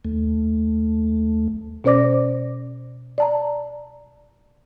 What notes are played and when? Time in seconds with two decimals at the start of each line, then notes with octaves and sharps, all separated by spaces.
0.05 D#2 A3
1.84 B2 C#4 C5 D5 D6 A#6
3.18 D5 A5 A#5